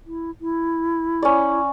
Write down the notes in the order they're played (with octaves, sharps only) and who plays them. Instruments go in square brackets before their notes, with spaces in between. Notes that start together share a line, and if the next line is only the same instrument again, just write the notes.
[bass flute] E4
E4
[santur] C#4 D5